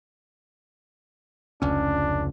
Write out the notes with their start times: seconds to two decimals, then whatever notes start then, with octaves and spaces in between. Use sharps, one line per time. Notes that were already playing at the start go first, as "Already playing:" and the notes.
1.62 F1 C#2 C#4 D4